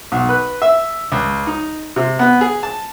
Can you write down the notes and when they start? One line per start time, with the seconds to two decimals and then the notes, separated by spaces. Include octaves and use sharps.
0.12 B1
0.29 B4
0.62 E5
1.12 C#2
1.47 D#4
1.96 C3
2.19 B3
2.41 G#4
2.63 A5